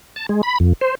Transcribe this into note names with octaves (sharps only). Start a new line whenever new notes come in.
A5
G#3
B5
F2
C5